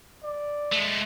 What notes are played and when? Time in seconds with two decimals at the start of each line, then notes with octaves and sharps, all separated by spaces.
0.23 D5
0.72 G#3 A3